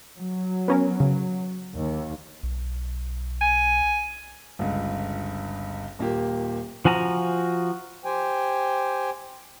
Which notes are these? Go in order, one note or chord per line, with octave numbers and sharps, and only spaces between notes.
F#3
B3 C#4 A#4
C#3
D#2
B1
G#5
G1 C#2
D#1 A#3 F4 G4
F3 F#4 G#5 A#5
G4 C5 G5 G#5